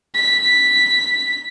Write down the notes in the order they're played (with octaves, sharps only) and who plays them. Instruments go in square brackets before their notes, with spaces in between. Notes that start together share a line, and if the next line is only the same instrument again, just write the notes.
[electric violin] B6